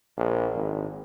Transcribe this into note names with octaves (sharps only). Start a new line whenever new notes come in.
A#1
G#1